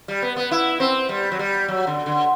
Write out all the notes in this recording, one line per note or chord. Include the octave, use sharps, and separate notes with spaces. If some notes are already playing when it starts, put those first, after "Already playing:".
G3
B3
B3
E4
C4
G3
F#3
G3
F#3
D3
D3